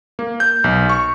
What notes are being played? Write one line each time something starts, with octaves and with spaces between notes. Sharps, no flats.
A#3
G6
B1
C#6